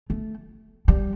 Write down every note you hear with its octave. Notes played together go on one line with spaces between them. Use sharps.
A3
G3